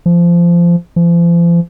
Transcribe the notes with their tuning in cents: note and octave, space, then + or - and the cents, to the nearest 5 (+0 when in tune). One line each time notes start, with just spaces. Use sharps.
F3 -20
F3 -40